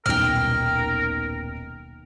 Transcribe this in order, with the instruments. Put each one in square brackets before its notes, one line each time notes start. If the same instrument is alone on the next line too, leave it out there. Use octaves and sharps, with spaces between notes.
[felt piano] D#1 B1 [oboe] A#4 [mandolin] G5 F6